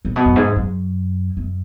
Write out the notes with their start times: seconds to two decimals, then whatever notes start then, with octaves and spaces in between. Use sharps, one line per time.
0.05 A#2
0.16 B2
0.25 F#2
0.36 G#2
0.56 F#2
1.37 F#2